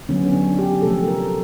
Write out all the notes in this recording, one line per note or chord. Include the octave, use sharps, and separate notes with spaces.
D3 F#3 B3 C#4
C#4
D4
G4
C3 F3 A3 A4
A#4